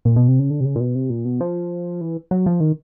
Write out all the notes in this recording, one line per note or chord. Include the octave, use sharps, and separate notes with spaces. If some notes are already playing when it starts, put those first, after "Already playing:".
A#2
B2
C3
C#3
D3
C3
C#3
A#2
B2
C3
A#2
B2
F3
E3
F#3
F3
D#3